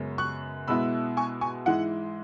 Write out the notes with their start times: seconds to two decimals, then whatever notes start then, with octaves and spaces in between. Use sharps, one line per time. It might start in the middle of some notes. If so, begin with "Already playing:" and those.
Already playing: F#2 C#3 G#3 B3
0.18 C#6 F#6
0.67 B2 G#3 B3 E4 B5 E6
1.17 G#5 C#6
1.41 G#5 C#6
1.66 G#2 E3 G#3 E4 F#5